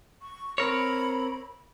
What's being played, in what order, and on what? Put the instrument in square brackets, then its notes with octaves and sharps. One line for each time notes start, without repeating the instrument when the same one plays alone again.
[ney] C#6
[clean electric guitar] C4 A#4 C#5 [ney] B5